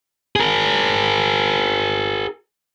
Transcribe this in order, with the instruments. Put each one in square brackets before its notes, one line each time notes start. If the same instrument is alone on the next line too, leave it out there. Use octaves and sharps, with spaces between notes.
[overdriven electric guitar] G#4 A#4